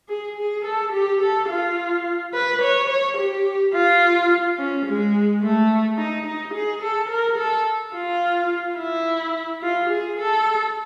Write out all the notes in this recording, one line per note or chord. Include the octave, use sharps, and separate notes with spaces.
G#4
G#4
A4
G4
A4
F4
B4
C#5
C#5
G4
F4
C#4
G#3
A3
D#4
D#4
G#4
A4
A#4
A4
F4
E4
F4
G#4
A4